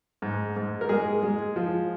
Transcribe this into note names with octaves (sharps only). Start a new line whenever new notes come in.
G#2
G#2
A#4
G#3 G#4
G#3
F3